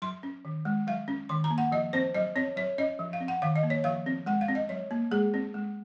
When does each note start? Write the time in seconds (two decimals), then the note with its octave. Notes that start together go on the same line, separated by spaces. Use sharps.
0.02 F#3 C6
0.23 C#4
0.45 D#3
0.65 G#3
0.87 F#3 F5
1.08 C#4
1.29 D#3 C6
1.44 A#5
1.50 A#3
1.58 F#5
1.72 F3 D#5
1.93 C4 C5
2.15 F#3 D#5
2.36 C4 C#5
2.56 F#3 C#5
2.78 C#4 D#5
2.99 F3
3.13 F5
3.20 C4
3.28 F#5
3.42 D#3 F5
3.56 D#5
3.63 A#3
3.70 C#5
3.84 F3 F5
4.06 C4
4.26 G#3 F#5
4.41 F5
4.48 C4
4.55 D#5
4.69 F#3 C#5
4.91 A#3
5.11 G#3 G#4
5.34 C4
5.54 G#3